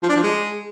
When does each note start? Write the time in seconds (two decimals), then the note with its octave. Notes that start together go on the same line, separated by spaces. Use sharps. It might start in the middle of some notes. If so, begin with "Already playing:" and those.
0.02 F3
0.09 D4
0.16 F3
0.23 G#3